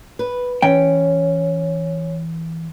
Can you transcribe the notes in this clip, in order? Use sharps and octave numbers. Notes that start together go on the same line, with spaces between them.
B4
E3 C#4 G5